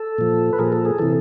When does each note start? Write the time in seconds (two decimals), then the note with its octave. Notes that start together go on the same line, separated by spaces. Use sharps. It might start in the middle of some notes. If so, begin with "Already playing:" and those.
Already playing: A4
0.18 A#2 F3
0.53 B4
0.59 A#2 F3 G#4 A#4
0.72 A4
0.85 G#4
0.98 C3 E3 A4